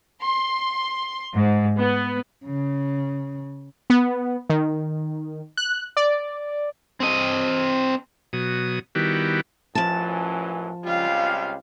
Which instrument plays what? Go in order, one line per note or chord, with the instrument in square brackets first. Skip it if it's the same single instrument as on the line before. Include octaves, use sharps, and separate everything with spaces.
[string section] C6
G#2
B3
[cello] C#3
[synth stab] B3
D#3
F#6
D5
[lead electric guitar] C4 D#5
[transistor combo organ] B2 F#3 D#6
D#3 G3 B3 E4 F#4 G4
[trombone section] A1 F#2 E3 [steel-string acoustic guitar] F3 A5
[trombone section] C#2 G3 C4 [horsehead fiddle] F4 F5